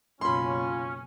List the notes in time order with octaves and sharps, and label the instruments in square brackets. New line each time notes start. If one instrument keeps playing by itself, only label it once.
[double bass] F#1 B2 [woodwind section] C#4 [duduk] F4 [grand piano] B5 C6